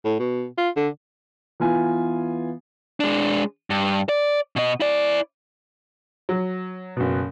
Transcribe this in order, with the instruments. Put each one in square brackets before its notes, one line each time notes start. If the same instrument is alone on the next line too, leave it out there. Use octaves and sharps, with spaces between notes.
[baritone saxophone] A2
B2
F4
D3
[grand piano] E3 B3 F4 G#5
[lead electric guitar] G#3 D4
G2
D5
B2 D#5
E4 D5
[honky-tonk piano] F#3
F#1 B2